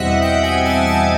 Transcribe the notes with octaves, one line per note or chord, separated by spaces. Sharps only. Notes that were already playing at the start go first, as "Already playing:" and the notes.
Already playing: E2 B2 G3 C4 D#5 E5 F#5
G5
G#5
A5
G#5